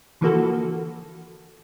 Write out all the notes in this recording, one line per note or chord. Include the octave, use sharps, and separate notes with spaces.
D3 E3 F3 A#3 F#4 A4